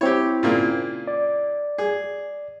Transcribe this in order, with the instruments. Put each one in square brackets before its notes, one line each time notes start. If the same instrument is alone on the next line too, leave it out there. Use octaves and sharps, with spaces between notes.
[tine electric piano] C4 E4 [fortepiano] G4 C#5
[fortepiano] A#2 C#3 A#3
[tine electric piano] D5
[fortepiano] G#4